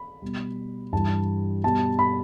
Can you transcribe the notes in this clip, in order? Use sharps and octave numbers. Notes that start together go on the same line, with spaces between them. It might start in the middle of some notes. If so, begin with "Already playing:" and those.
Already playing: B5
B2 G3
G2 E3 G3 A5
B2 G3 A5
B5